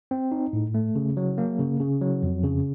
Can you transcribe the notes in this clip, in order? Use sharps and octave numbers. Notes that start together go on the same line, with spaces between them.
C4
D#4
A2
A3
C#3
F#3
A#3
C#3
C#3
F#3
F2
C#3